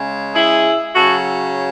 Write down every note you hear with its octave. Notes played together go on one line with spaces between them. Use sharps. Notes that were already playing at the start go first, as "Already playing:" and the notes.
Already playing: C#3 G#3
E4 G#4
C#3 F#3 F#4 A4